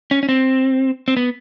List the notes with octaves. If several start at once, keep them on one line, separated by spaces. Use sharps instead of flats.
C#4
C#4
C4
C4
B3